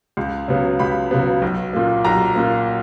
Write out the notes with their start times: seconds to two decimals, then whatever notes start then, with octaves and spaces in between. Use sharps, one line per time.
0.17 C#2
0.48 C#3 F#3 B3
0.79 C#2 B5
1.11 C#3 F#3 B3
1.42 B1
1.73 A#2 A#3
2.05 B1 A#5
2.35 A#2 A#3